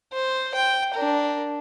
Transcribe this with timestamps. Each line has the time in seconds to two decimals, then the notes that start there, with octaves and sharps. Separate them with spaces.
0.13 C5
0.54 G5
0.94 D4 A#4